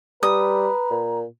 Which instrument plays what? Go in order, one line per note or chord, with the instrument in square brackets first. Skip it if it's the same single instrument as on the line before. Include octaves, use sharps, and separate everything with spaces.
[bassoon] G3 [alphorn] B4 [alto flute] A#5 [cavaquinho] D#6
[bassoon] A#2